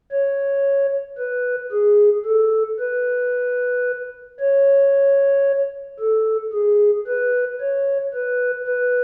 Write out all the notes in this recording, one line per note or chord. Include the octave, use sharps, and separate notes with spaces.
C#5
B4
G#4
A4
B4
C#5
A4
G#4
B4
C#5
B4
B4